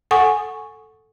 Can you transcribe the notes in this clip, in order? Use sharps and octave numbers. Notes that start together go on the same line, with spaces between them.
A4 F#5 G#5 C#6 D#6